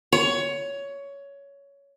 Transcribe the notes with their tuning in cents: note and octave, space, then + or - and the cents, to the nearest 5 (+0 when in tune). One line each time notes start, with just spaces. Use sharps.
C#5 +15